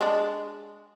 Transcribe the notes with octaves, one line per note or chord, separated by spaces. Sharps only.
G#3 D4